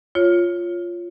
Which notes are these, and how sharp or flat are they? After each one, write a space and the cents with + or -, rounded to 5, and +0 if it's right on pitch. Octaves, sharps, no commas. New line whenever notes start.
F4 +0 C#5 +0